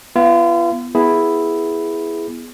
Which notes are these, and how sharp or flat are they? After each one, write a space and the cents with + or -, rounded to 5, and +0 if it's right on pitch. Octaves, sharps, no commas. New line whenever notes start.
B3 +0 F4 -40
B3 +0 E4 +0 G#4 +0